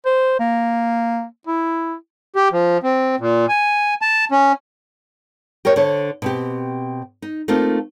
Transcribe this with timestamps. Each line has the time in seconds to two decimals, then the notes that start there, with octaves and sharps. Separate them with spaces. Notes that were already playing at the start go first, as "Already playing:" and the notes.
0.06 C5
0.40 A#3
1.47 E4
2.36 G4
2.53 F3
2.83 C4
3.20 A#2
3.49 G#5
4.02 A5
4.32 C#4
5.65 G4 A#4 C5 C#5
5.76 D3 C5 C#5
6.22 B2 C4 G4
7.22 D#4
7.48 A3 A#3 C4 D#4 F4